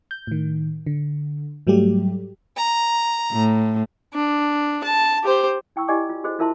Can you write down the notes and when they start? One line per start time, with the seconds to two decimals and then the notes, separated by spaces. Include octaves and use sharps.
0.11 G6
0.27 A2 D#3
0.86 D3
1.67 G#2 F#3 G3 A3 G4
2.56 A#5
3.32 A2
4.14 D4
4.84 A5
5.24 G4 C5
5.76 E4 G5 C#6 E6
5.88 E4 G4 D5 D#5 G#5 D6
6.09 F4
6.24 F#4 G#4 C5 D#5
6.39 E4 F4 A#4 E5 A5 C6